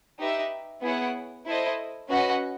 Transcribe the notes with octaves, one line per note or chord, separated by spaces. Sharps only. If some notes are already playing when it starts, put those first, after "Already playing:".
D#4 G4 B4 E5
B3 E4 G#4 C#5 F#5
E4 A4 C5 D#5
C#4 F#4 B4 D#5 F#5